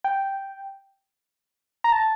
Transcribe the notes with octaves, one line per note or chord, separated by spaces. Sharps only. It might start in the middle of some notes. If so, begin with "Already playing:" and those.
G5
A#5
A5